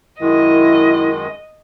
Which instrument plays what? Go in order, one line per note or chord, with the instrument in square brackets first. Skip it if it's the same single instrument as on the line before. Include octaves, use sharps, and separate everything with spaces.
[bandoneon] F#2 D#3 G#3 [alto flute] E4 [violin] D#5